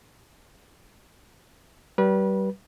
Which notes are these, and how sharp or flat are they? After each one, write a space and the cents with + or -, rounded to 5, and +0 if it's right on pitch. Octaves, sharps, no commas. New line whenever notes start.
G3 -30 B4 -30